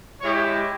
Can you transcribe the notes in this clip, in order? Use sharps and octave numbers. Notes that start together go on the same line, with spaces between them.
G#3 E4 G4 C#5